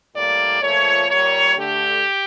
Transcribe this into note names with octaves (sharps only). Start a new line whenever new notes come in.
A2 G3 A#3 D5
A#2 F3 A3 C#5
A#2 G3 A#3 C#5
D3 A3 G4